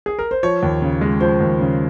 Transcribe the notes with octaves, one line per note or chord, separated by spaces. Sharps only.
G#4
A#4
C5
F3 C#5
D#2
C#3
G#3
F3 C5
D#2
C#3